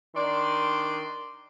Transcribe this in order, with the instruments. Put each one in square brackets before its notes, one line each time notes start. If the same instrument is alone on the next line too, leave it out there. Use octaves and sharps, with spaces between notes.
[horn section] D#3 D4 D5 C6